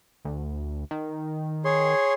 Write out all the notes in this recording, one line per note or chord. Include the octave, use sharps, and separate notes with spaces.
D2
D#3
G#4 C#5 C6